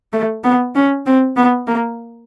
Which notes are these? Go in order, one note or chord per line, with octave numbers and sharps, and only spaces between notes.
A3
B3
C#4
C4
B3
A#3